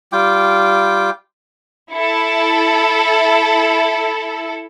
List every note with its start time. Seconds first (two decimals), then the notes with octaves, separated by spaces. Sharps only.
0.13 G3 F4 G5 D6
1.91 E4 A4